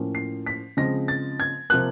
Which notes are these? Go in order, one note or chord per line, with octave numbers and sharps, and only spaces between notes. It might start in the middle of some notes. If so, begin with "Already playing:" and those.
Already playing: A2 F3 A#3 C#4
C7
B6
C#3 F3 G#3 C4 A#6
A6
G#6
C3 F3 A#3 F#6